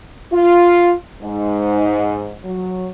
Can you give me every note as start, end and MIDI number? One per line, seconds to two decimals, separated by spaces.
0.32 0.94 65
1.22 2.35 44
2.44 2.90 54